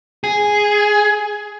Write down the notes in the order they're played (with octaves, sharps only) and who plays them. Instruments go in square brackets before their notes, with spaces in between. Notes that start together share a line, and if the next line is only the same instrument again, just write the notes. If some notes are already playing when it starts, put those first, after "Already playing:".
[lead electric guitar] G#4